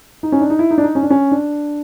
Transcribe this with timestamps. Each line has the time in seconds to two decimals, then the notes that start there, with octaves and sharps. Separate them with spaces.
0.23 D#4
0.32 C#4
0.41 D4
0.50 D#4
0.59 E4
0.71 D#4
0.78 D4
0.83 D#4
0.95 C#4
1.03 D4
1.10 C#4
1.32 D4